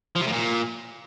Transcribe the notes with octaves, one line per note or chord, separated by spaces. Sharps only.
F3
C3
A2
A#2